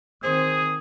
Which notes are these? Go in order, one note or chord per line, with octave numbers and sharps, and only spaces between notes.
D#3 C4 G#4 C5 D#6